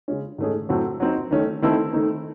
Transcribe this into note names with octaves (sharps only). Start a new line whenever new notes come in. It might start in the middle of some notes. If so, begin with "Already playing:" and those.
C#3 G#3 C#4
G#2 D#3 A3 C#4 G#4
A2 F#3 C4 F#4 A4
F#3 C4 D#4
D#3 A3 C#4
D#3 A3 C4 E4 A4
D#3 A3 C4 D#4